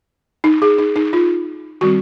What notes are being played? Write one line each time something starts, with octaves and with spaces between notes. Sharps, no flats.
D#4
G#4
D#4
D#4
F4
D#3 G3 C4 F#4